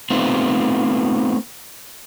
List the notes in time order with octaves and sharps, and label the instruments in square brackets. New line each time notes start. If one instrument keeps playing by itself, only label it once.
[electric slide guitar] A3 B3 C4 D#4 F4